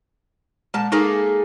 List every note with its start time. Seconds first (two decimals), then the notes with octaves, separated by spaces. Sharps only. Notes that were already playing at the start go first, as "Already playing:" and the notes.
0.74 A#2 G#3 A5
0.92 A3 A#3 D#4 G#4